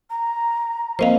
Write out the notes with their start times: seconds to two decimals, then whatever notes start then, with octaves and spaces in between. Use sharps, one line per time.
0.10 A#5
0.99 F3 A#3 C4 C5 D#5 F5